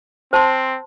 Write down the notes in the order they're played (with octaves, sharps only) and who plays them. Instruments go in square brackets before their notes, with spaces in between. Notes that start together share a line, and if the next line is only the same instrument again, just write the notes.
[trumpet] C4 [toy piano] C5 A5 C6